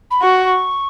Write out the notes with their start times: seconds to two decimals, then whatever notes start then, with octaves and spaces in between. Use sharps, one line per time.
0.10 B5
0.22 F#4 C#6